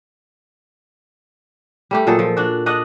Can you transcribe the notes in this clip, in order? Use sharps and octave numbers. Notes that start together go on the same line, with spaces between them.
G3 A3 G4
A#2 F#3 G#4 A4
F3
D4 F#4
D4 D#5 F#5